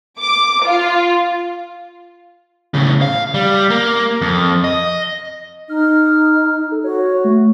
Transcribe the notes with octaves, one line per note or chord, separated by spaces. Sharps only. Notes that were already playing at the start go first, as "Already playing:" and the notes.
D6
F4
A2 C#3
F5
G3
A#3
F2
D#5
D#4 F6
A4
F#4 C#5
A3